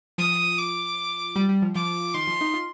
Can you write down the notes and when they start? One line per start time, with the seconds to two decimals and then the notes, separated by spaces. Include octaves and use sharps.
0.18 F3 D#6
0.58 D6
1.36 G3
1.49 G3
1.62 F3
1.75 F3 D6
2.15 D#3 C6
2.27 F3
2.41 D#4
2.54 F4